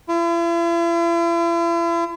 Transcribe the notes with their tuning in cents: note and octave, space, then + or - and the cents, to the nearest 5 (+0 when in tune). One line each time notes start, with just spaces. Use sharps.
E4 +45